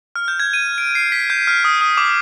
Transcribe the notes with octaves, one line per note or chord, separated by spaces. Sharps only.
F6
G6
G#6
D#7
D7
C7
B6
G6
F6
D#6
D#6
D6